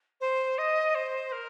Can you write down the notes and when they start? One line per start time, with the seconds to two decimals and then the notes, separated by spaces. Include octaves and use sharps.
0.21 C5
0.58 D#5
0.95 C5
1.32 A#4